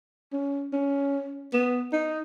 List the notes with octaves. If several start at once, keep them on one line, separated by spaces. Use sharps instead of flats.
C#4
C#4
B3
D#4